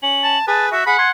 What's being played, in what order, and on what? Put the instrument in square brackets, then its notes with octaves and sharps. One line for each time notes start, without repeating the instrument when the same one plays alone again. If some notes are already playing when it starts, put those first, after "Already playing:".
[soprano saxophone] C#4 [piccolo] F#7
[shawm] A5
[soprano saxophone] G#4 [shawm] B4 [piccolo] A5
[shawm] F#4 [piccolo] E5
[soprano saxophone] G#4 [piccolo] F#5 [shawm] B5
[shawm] G#5 [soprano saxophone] C6